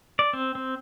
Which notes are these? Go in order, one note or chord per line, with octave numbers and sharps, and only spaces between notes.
D5
C4
C4